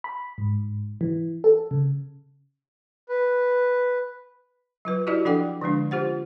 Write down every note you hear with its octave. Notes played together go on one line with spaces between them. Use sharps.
B5
G#2
E3
A4
C#3
B4
F#3 F4 B4
E4 F#4 G4 D5 D#5
F3 D4 A4 F#5 G5 D6
D3 F3 G#3 D4
F4 G4 C5 F#5